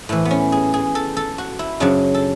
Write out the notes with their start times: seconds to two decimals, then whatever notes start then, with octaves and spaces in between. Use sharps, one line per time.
0.09 A2 E3 E4
0.25 B3
0.31 C#4
0.52 G#4
0.74 G#4
0.95 A4
1.17 A4
1.38 F#4
1.59 E4
1.80 F#2 C#3 F#3 D4
2.14 A4